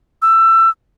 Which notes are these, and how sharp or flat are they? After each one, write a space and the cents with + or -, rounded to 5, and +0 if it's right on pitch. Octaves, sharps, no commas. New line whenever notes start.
E6 +20